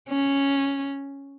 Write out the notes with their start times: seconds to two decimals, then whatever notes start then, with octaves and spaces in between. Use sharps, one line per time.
0.09 C#4